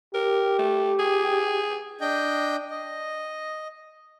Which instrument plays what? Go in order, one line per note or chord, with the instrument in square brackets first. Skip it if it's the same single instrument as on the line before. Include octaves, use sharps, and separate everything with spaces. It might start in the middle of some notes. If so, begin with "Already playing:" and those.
[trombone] G4 [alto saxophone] A#4
[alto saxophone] A3
G#4
[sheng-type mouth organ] D4 D#5 G5 G6
D#5